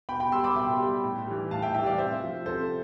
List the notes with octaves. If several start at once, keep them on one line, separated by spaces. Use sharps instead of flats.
B2 G5 B5
G5 B5
G3 C6 E6
B5 D6
B2 E5 G5
G3
A2
E3 G3
A2 F5 A5
E5 G5
E3 G3 E5 G5
D5 F5
C3 C5 E5
F3
C3 A4 C5